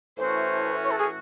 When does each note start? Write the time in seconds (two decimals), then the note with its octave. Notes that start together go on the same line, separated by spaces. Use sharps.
0.17 A2 E3 A3 C#4 F#4 C5
0.83 C#5
0.91 A4
0.99 G#4